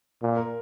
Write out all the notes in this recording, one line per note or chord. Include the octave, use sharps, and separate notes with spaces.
A#2
A#4